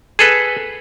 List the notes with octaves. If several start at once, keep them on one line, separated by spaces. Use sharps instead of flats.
G#4 A4 B4